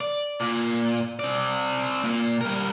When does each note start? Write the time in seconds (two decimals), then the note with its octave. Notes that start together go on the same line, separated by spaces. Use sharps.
0.01 D5
0.40 A#2
1.19 C4 D5
2.04 A#2
2.41 G3 A#4